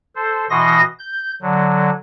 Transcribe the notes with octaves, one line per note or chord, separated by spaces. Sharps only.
A4 C5
B2 E3 F#4 D#5 C6 A#6
G6
D3 F#3